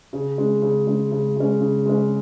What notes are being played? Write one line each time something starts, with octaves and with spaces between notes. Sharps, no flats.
C#3
G#3 C#4
C#3
G#3 C#4
C#3
G#3 C#4
C#3
G#3 C#4